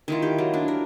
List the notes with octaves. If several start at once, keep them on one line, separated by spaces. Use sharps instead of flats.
D#3 E4 F4
G4
F#3
D4
A#4